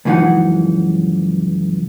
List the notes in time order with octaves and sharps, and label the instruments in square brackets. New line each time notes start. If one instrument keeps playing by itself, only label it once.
[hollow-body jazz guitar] C#2 F#2 E3 F3 D#4 F#5